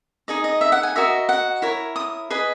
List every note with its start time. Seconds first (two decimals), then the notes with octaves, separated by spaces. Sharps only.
0.28 D#4 G#4 D#5
0.44 D#5
0.61 E5
0.72 F#5
0.83 G#5
0.96 F#4 A#4 D#5 E5
1.29 F#5
1.62 E4 A#4 C#5
1.96 D#6
2.30 G#4 B4 D#5